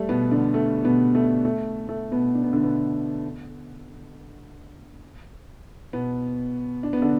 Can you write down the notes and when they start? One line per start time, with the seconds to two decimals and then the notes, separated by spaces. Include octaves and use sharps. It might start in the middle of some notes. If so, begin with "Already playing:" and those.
Already playing: G3 A3
0.09 B2 B3
0.31 D3 D4
0.54 A3
0.84 B2 B3
1.15 A3
1.45 A3
1.89 A3
2.11 B2 B3
2.35 D4
2.44 B3
2.53 D3 D4
2.64 B2 B3
5.93 B2 B3
6.83 D4
6.93 B3
7.02 D3 D4